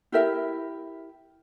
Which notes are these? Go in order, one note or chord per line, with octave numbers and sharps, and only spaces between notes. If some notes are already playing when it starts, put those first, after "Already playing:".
E4 G4 A#4 E5